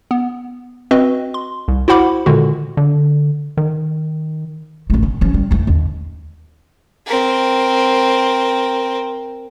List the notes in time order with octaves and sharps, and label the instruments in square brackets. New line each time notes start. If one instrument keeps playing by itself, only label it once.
[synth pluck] B3
C4 F#4 B4 D#5
C6
C2
E4 F#4 C5 F#5 B5 D6
A#2 D3 D#3 G#3 F#4
[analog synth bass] D3
D#3
[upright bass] E1 A3
C2
F3 C#4
G3
E2 A3
D#2 D3
[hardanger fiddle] C4 A#4